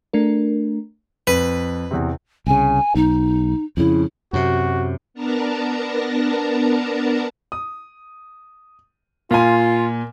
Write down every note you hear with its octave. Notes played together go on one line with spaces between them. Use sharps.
A3 D4 A#4
F2 B4
E2 C3
C2 C#3 G#5
B1 D#4
F2 C#3 E4
F#2 C3 F#4
B3 D4 A#4 A5 A#5
D#6
A#2 F4 G#5